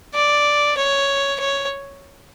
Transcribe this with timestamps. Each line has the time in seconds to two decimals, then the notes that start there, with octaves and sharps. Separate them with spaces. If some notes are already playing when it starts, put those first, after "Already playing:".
0.15 D5
0.77 C#5
1.40 C#5